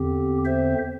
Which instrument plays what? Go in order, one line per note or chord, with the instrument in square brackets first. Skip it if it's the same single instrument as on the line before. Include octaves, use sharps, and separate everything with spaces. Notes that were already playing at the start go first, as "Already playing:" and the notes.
Already playing: [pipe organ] E2 D3 C4 G4
C5 E5